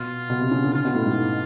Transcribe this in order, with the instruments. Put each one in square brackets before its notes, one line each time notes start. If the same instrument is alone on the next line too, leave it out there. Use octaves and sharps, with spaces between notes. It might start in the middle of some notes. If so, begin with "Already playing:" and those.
Already playing: [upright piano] B2 [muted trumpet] F4
[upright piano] B2
C3
C#3
D3
[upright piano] C#3 [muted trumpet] F4
[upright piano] B2
A2
G#2
A2